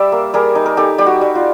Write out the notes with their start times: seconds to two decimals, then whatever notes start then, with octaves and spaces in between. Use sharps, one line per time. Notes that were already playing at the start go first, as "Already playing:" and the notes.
Already playing: G3 D5 E5
0.12 A#3
0.34 G3 G#4 A#4
0.55 D#4
0.66 A#4
0.77 D#4 G4 A4
0.98 G3 G4
1.06 F#4
1.21 G3
1.35 F4